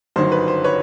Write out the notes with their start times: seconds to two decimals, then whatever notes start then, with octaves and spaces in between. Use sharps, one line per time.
0.16 G1 F#2 D#3 F#3 C5
0.32 B4
0.48 C5
0.64 B4 C#5